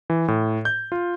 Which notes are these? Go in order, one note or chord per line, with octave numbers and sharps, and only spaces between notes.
E3
A2
G6
F4